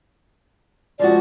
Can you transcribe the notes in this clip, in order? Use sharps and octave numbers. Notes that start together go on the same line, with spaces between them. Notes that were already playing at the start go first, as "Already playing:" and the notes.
F3 G#3 F#4 D5